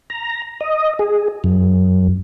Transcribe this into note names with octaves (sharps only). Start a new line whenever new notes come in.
A#5
D#5
G#4
F#2